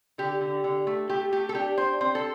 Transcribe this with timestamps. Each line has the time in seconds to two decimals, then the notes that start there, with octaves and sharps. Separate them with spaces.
0.18 D3 G4
0.41 D3
0.64 D3
0.87 A3
1.09 A3 G4
1.32 A3 G4
1.49 A4
1.55 D4 G4
1.78 D4 C5
2.01 C4 C5
2.15 A4